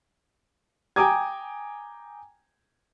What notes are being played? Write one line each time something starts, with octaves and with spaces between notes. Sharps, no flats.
G5 G#5 A#5 D6 D#6 G#6